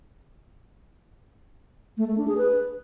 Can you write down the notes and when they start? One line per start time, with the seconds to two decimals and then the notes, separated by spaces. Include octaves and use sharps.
1.98 A3
2.08 A3
2.18 D4
2.28 G#4
2.38 B4